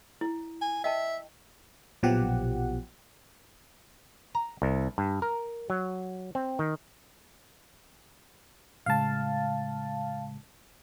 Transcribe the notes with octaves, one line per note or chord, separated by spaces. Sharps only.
E4
G#5
D#5 E5 G5 A5
A#1 B2 F3 F#3 G4 F#5
A#5
C2
G2
A#4
F#3
C4
D#3
A2 C#3 G#3 F5 A5